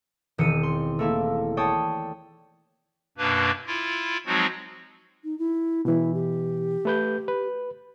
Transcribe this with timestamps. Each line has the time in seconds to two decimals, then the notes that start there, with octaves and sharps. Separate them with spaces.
0.38 E1 D#3 C4 C#7 D#7
0.63 C6
0.99 A3 A#3 E4
1.57 C#5 D5 G5 A5 C#6 D#6
3.18 F#2 B2 A#3 D4 B4
3.66 E4 F4
4.26 F3 F#3 G#3 C4 D#4 F#4
5.24 D#4
5.38 E4
5.85 B2 E3 E4
6.14 G4
6.85 A3 B4 G6
7.28 B4